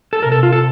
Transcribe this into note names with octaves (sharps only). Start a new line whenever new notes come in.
A4
C3 A#4
A4
F4
A4